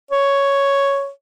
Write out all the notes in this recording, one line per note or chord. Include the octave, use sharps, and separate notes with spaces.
C#5